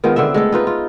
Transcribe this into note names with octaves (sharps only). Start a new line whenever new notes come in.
D#3 G#3 B3 F4
D3 B3 C4 E5
G#3 A3 A4
D#4 F4 B4
F4